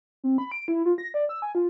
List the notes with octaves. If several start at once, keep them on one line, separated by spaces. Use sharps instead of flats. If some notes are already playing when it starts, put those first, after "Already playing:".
C4
B5
D7
E4
F4
A#6
D5
E6
G#5
F4